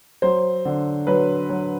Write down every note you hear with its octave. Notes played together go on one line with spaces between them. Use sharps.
F#3 C5
D3
F#3 B4
F#3